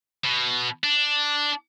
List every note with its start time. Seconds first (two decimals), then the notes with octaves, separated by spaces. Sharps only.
0.24 B2
0.84 D4